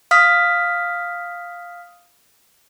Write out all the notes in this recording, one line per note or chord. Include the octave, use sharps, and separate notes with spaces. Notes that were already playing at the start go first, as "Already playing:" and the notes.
F5 D#6 F6 B6